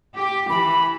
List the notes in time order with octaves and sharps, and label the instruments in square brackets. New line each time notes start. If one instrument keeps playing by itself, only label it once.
[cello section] G4
[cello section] E3 [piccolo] B5